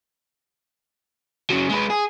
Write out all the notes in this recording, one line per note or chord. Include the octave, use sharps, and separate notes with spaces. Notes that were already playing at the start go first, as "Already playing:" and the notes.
C#3 F#3
G#3 B4
G#4